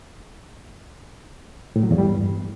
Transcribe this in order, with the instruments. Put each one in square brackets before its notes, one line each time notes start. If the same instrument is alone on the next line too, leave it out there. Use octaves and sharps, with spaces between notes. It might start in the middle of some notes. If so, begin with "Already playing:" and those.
[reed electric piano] A2
F#3
E2
G3
G2